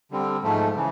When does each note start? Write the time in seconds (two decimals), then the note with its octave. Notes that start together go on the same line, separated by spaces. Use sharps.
0.11 D3 G3 C4
0.43 G#2 F3 A3
0.75 C#3 E3